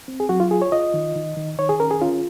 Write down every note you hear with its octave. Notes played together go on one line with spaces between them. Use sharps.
C4
G#4
F#3 F#4
F4
F4 G#4
C#5
F4 D#5
D#3
D#3
D#3
D#3 C#5
G#4
C#4 A#4
G#4
C#4 F4